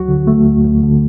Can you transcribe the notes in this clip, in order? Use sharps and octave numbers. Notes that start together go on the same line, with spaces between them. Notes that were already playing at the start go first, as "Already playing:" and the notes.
Already playing: D2 F#3 F#4
D3
A3
D2
D2
D3